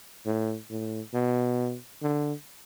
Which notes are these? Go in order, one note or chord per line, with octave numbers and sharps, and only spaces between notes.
A2
A2
B2
D3